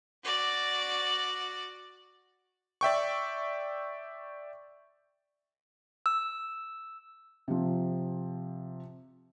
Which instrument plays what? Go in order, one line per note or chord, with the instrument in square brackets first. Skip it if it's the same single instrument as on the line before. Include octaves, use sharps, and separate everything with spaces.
[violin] F#4 D5
[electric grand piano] D5 E5 G5 C#6
[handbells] E6
[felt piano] C3 F3